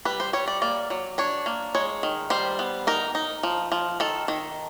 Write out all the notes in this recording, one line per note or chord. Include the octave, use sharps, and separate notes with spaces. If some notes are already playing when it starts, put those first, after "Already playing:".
G3 B4
C5
G3 C#5
D5
A#3 D5
F#3
D4 C#5
A#3
G#3 C#5
D#3
G3 C5
B3
D#4 A#4
D#4
F3
F3
D#3 A4
D#3